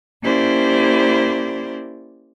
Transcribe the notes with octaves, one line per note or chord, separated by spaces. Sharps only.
A#3 C#4 E4 G4 C5 D5